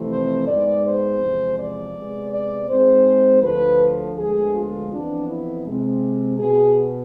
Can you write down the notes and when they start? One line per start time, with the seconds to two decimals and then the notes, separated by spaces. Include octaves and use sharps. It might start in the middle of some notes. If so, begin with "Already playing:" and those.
Already playing: F2 C3 E3 A3 C4
0.09 C5
0.46 G#2 G#3 B3 D5
0.84 C5
1.20 E2 C3 F3 G#3
1.57 D5
1.94 C3 G#3 B3
2.32 D5
2.68 G#2 G#3 C4 C5
3.42 D2 D3 F3 B4
4.16 D2 D3 F3 G#3 B3 G#4
4.54 F4
4.90 F2 E3 B3 D4
5.28 E4
5.65 C3 G#3 C4
6.38 B2 G#4
6.43 B3